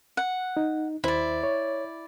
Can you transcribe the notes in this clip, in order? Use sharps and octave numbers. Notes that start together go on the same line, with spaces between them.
F#5
D#4
D#2 E4 C5 D5
C#5